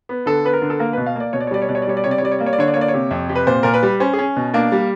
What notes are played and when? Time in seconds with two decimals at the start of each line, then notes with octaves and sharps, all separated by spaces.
0.09 B3
0.26 D3 A4
0.45 B3 B4
0.53 A#4
0.62 D3
0.70 A4
0.79 A#3 A#4
0.93 B2 B4
1.06 F5
1.16 A#3 D5
1.33 B2 C#5
1.40 D5
1.47 C#5
1.51 G3 D5
1.62 C#5
1.69 B2 D5
1.75 C#5
1.82 D5
1.87 G3 C#5
1.97 D5
2.04 C3 C#5
2.11 D5
2.18 C#5
2.22 G3 D5
2.32 C#5
2.39 A#3 D5
2.46 C#5
2.53 D5
2.58 D3 C#5
2.68 D5
2.74 A#3 C#5
2.81 D5
2.88 C#5
2.94 C3
3.11 F2
3.29 C3
3.35 B4
3.47 A#2 C5
3.63 A#2 A#4
3.74 B4
3.83 G3
4.00 C#4 C5
4.13 G#4
4.19 C#4
4.36 B2
4.54 A#3 D4
4.72 G3